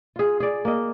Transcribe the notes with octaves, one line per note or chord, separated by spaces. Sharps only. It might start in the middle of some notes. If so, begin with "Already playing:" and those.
F4 G#4
G#4 D5
A#3 D#5